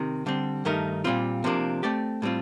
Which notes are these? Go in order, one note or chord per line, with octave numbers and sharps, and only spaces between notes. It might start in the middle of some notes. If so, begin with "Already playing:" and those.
Already playing: C3 D#3
D3 G3 C4
G2 D#3 A3 D#4 A#4
A#2 G3 C4 F4
C3 F3 A#3 D4
A3 C4 G4 D5
A2 G3 C4 F4